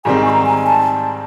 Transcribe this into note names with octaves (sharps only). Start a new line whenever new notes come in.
G#2 D#3 G3 C4 G#5
C#6
A#5
G#5
A5